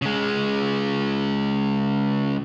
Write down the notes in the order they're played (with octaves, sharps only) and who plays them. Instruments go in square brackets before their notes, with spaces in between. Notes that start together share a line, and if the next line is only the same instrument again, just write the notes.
[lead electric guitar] C#3 G#3